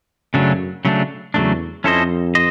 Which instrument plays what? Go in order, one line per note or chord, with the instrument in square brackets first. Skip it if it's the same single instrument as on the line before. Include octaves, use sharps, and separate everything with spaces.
[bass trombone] F#2 [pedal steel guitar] C#3 F#3 A3 D4
[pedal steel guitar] C#3 F#3 A3 D4
[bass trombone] E2 [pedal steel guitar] C#3 F#3 A3 D4
[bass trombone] F2 [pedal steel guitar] C#4 E4 A4 C5 D#5
[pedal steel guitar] C5 D#5